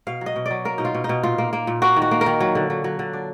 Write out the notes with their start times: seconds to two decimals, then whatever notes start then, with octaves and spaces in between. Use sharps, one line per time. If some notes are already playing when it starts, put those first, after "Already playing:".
0.07 B2 F5
0.21 F#3
0.26 D#5
0.36 B2
0.46 D5
0.51 F#3
0.65 A#3 A#4
0.78 B2 D#4
0.85 F4
0.94 B2
1.04 D#4
1.09 B2
1.23 A#2 F4
1.38 A#3
1.53 A#3
1.67 A#2
1.82 A#3 F#4
1.96 D#3
2.02 F#4
2.11 A#3
2.21 A#4
2.26 D#3
2.40 F#3
2.55 D3
2.70 F#3
2.84 F#3
2.99 D3
3.13 D4